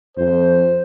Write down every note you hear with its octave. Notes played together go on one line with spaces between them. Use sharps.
F2 C5